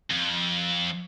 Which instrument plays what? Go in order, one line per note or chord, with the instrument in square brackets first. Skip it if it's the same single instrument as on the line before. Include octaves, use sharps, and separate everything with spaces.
[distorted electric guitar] F2